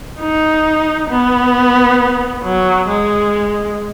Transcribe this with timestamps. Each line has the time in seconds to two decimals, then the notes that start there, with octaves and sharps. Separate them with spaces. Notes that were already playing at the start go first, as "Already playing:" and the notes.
0.20 D#4
1.10 B3
2.44 F#3
2.88 G#3